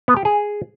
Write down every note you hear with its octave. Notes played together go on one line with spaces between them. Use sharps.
B3
G4
G#4